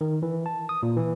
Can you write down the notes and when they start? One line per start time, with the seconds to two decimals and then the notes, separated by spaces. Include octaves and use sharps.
0.01 D#3
0.22 E3
0.46 A5
0.69 D#6
0.83 A#2
0.97 E3